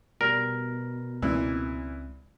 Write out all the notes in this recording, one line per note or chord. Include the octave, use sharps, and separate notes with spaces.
B2 G3 A#4
C#2 A#2 E3 G#3 C4